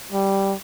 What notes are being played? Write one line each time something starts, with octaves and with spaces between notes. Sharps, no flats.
G3